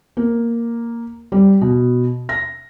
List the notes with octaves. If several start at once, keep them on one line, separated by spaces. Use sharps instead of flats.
A#3
G3
B2
A#6